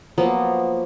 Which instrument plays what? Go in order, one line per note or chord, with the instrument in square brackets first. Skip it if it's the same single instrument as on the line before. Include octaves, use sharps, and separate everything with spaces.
[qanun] F3 F#3 A#3 B3